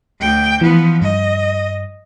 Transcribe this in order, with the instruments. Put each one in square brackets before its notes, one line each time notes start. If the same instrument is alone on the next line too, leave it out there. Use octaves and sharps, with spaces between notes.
[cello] D2 G5
[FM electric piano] E3 [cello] F3 B3
[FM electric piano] G2 [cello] D#5